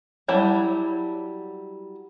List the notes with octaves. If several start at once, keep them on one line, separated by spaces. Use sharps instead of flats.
F#3 G3 E4 C#5 A5